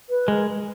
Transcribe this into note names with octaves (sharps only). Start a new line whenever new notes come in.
B4
G#3 A#4